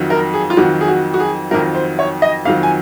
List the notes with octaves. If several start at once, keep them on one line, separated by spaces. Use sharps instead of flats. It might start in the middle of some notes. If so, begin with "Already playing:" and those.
Already playing: F2 D#3 F#3
A#4
G#4
F4
F2 D#3 F#3 F#4
G#4
F#4
F#4
G#4
F2 D#3 F#3 A#4
C5
C#5
D#5
F2 D#3 F#3 F5
G#5